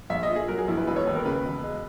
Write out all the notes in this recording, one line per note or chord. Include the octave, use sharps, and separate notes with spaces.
A#1 E5
D#5
A#2
G#4
F#3 A#4
G#4
A#1 E4
B4
E1 B4
C#5
D#2 B4
A#4
C#3 B4
E1
G#3